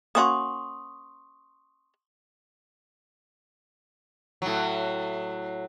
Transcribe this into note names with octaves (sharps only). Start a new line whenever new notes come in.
A#3 C#4 F#4 C6 C#6 D#6
A2 F#3